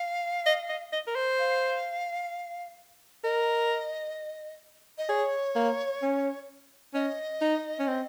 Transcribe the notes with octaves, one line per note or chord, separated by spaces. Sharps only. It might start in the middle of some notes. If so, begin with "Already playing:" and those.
Already playing: F5
D#5
D#5
D#5
A#4
C5
F5
A#4 D#5
D#5
G#4 C#5
A#3
C#4
C#4 D#5
D#4
C#4
C4